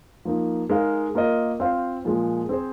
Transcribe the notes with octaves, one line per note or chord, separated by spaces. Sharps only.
F3 A#3 D#4
G#3 D#4 A#4 F5
A#3 F4 A#4 D#5
C4 F4 C5 F5
A#2 F3 G#3
C4 G#4 C5